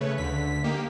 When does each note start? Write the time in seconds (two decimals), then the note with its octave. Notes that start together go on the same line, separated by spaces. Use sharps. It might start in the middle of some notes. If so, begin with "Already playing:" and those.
0.01 C#3 A3 B4 C#5
0.18 D2 D3 B6
0.64 A#3 D#4 G4